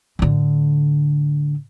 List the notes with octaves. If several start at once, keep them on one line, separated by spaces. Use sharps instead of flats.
A2 D3